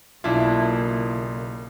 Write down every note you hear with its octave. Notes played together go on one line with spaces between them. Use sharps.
B1 C#3 A#3 D4 E4 F4